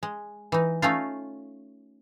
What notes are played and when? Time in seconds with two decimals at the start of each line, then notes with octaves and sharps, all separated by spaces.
0.03 G#3
0.52 E3 D#4
0.82 A3 C#4 D#4 F4